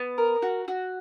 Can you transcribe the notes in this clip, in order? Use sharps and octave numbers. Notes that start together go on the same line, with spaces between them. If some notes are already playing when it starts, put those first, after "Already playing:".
Already playing: B3
A#4
F#4
F#4